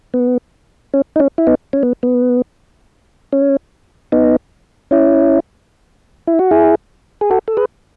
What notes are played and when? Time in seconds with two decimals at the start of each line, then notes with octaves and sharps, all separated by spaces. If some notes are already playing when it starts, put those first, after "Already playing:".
0.14 B3
0.94 C#4
1.16 D#4
1.20 C#4
1.38 E4
1.47 B3 D#4
1.73 C#4
1.83 B3
2.03 B3
3.33 C#4
4.12 B3 D#4
4.91 C#4 E4
6.27 E4
6.39 F#4
6.51 E4 G#4
7.21 G#4
7.31 F#4 A4
7.48 A4
7.57 G#4 B4